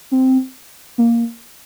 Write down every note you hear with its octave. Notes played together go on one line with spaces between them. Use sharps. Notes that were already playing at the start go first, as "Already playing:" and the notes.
C4
A#3